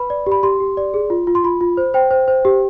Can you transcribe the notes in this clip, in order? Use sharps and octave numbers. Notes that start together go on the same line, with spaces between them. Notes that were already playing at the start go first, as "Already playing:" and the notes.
Already playing: B4 B5
D5
G4
B5
G4 C6
G4
D5
G#4
F4
F4
C6
F4 B5
F4
C5
C5 G5
C5
C5
G4